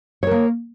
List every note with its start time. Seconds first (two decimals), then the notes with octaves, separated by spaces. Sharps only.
0.23 C#5
0.27 A#4
0.31 A#3